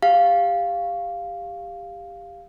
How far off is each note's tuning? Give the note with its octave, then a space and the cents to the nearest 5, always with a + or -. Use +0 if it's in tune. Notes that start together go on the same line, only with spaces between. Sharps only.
G4 +20 F5 +0